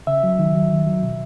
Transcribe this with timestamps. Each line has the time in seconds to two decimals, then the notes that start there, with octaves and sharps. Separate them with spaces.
0.07 C#3 E5
0.23 F#3
0.39 D#3
0.55 F#3
0.72 D#3
0.87 F#3
1.03 B2